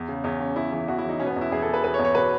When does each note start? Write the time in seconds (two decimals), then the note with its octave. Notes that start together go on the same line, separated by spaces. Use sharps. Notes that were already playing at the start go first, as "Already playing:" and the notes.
Already playing: E2
0.08 C#3
0.24 E2 C#4
0.40 C#3 C#4
0.56 E2 E4
0.72 E3 E4
0.88 E2 F#4
0.98 E4
1.04 E3 D#4
1.20 B2 C#4
1.27 B3
1.31 C#4
1.36 E2 E4
1.52 E2 G#4
1.62 A4
1.68 B2
1.74 B4
1.84 E2 B4
1.94 C#5
1.99 E2
2.04 C#5
2.15 B2 B4